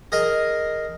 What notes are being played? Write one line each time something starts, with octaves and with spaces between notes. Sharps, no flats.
G#4 A#4 D#5 A#5